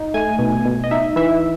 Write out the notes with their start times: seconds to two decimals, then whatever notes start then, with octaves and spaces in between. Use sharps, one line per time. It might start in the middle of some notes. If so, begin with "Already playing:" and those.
Already playing: D#4
0.14 A3 G#5
0.39 B2
0.65 B2
0.84 D#5
0.91 D#4 E5
1.16 E3 E5